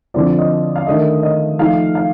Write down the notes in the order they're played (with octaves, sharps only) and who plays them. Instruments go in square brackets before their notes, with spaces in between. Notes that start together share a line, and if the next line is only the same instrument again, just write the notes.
[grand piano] D3 F3 C4 F4 D5
D#5
F5
D#3 A3 D4 D#5
D#5
F3 A3 D#4 F5
F5